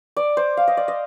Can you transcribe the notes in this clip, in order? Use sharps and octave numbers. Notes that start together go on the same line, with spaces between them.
D5
C5
F5
D#5
D5
D#5